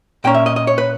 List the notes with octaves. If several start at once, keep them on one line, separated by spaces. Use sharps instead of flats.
A#2 A#3 C#4 G5
E5
D#5
D#5
C#5
B4